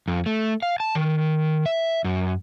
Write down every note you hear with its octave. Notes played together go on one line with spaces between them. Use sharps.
F2
A3
F5
A5
D#3
E5
F#2